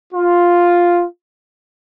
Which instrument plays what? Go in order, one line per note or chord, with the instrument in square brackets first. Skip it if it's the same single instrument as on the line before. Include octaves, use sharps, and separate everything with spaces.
[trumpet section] F4